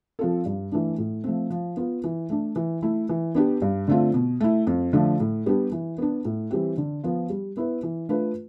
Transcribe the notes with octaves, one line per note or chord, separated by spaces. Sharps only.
F3 C4 F4 A4
G2
E3 A3 D4
A2
F3 A3 C4
F3
B3 F4
E3
A3 D4
E3
A3 E4
E3
B3 D4 G4
G2
D3 A3 C4 F4
B2
A3 E4
F2
D3 F3 A3
A2
G3 B3 D4 G4
E3
B3 D4
A2
E3 G3 C4 G4
D3
F3 B3 F4
G3
B3 E4 B4
E3
A3 D4 F4 B4